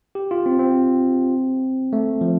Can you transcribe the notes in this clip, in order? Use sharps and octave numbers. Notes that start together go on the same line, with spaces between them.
G4
F4
C4
C4
A3
F3